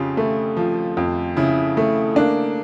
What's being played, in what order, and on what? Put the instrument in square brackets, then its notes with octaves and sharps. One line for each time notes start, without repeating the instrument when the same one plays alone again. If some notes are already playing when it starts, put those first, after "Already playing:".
Already playing: [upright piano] F2 C#3 F4 G4
A3
F3
F2
C#3 E4
A3
A#3 D4